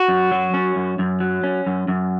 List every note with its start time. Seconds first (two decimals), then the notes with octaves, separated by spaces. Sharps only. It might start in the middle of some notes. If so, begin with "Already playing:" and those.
Already playing: F#4
0.08 F#2
0.31 F#3
0.54 C#4
0.76 F#2
0.99 F#2
1.20 F#3
1.43 C#4
1.67 F#2
1.88 F#2